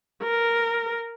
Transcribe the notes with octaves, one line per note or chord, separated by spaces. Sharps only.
A#4